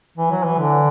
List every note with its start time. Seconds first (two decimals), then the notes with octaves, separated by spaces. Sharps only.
0.18 E3
0.31 F#3
0.44 E3
0.59 D3